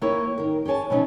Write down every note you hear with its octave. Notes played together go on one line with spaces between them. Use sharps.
E3 A#3 E4 G4 B4 C#5
D#3 A#4
G4 G#4 C#5 G#5 A5
B2 F3 F#3 C#4 D#4